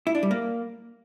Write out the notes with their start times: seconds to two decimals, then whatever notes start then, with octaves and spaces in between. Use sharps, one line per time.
0.07 E4
0.15 D4
0.23 G3
0.31 A#3